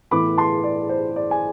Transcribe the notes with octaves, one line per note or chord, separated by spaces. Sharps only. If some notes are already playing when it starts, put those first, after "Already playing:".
A2 E3 B3 B5 D6
A5 C6
D5
C5
D5
G#5